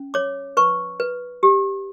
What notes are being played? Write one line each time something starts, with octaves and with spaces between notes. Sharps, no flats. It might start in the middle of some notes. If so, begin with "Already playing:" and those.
Already playing: C#4
C#5 D6
B4 C#6
B4
G4